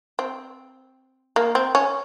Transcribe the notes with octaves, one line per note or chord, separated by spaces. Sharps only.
C4
A#3
C4
C#4